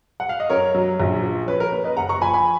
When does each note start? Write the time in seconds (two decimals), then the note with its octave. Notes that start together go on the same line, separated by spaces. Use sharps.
0.20 F#5
0.29 F5
0.40 D#5
0.50 F#2 A#4 C#5
0.74 F#3
1.00 A#1
1.23 F3
1.47 C#4 B4
1.60 A#4
1.72 A#3 B4
1.84 B4 D#5
1.96 F#1 F#5 A#5
2.09 A#5 C#6
2.21 F3 G#5 B5
2.34 G#5 B5